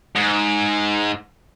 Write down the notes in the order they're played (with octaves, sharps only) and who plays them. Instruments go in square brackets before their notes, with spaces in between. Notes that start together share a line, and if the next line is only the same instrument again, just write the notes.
[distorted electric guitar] G#2